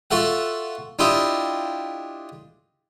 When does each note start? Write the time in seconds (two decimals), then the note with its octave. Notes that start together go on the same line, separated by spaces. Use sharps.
0.11 F4 F#4 A4 E5 F#5
0.99 D4 E4 F4 G4 D#5 E5